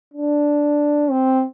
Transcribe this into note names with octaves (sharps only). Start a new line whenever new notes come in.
D4
C4